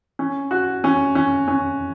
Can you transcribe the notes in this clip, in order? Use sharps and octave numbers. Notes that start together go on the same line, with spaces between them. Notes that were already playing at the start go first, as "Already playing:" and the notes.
C#4
F#4
C#4
C#4
C#4